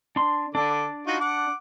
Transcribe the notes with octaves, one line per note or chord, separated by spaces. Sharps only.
D4 C6
D3 D4 A4 D5 D6
D#4 F4 F#4
F#5 D6